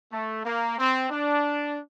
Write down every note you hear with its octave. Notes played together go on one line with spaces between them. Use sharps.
A3
A#3
C4
D4